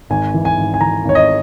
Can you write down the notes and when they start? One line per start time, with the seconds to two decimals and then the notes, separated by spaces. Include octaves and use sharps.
0.10 G#1 G#5
0.34 E3
0.45 G#5
0.58 G#1
0.74 G#5
0.80 E3 A#5
1.05 G#1 C#5
1.15 D#5